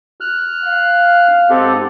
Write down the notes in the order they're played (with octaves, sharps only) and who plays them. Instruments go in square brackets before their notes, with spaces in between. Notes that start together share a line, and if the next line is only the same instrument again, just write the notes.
[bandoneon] F6 F#6
[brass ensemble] F5
[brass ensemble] G#2 D#5 F#5 [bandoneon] C4 G4 A4